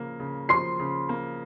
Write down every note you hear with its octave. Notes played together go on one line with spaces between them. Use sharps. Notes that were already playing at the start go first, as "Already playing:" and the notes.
Already playing: C#3 F3 A#3
C#3
F3 C6 C7
C#3
A#3